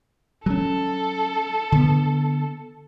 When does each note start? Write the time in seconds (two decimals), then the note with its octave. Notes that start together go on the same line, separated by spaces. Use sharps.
0.46 F#3 C#4 A4
1.72 D3 B3